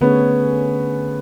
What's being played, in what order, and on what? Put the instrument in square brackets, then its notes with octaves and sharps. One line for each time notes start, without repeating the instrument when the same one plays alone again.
[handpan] D3 A3 C#4 G#4 C#5 [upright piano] B3